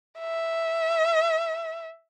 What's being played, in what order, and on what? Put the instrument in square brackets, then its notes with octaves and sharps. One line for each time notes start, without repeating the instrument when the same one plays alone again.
[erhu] E5